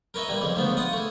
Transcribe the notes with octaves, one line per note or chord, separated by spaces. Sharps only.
A#4 B4 C#5 D#5 E5
A#2 E3 G3
F2 C#3 E3
D2 G#2 F3 F#3 B3
F4 F#5 D#6
E3 A3